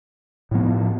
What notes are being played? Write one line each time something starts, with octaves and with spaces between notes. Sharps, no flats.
A2 F3 B3